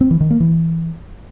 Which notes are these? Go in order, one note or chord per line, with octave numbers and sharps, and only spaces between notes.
C4
E3
D#3
A#3
E3